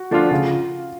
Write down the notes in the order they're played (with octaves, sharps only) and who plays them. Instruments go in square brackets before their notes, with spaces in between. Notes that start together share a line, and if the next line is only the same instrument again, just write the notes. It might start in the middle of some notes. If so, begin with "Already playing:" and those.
Already playing: [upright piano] F#4
[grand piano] F3 A3 D4 F4
[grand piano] C#3 [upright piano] F4